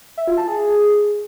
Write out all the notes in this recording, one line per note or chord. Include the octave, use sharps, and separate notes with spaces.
E5
F4
A5
G#4